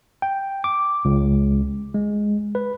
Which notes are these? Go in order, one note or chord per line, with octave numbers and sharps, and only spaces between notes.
G5
D6
C#2
G#3
B4